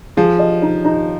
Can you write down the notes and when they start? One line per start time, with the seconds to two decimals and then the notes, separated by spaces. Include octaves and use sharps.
0.17 F3 G#4
0.39 D#5
0.62 D#4
0.85 D#4